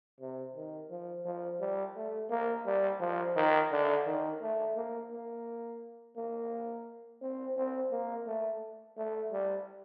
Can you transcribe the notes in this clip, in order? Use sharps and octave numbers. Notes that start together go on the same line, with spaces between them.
C3
D#3
F3
F3
G3
A3
A#3
G3
F3
D#3
D3
D#3
A3
A#3
A#3
A#3
C4
C4
A#3
A3
A3
G3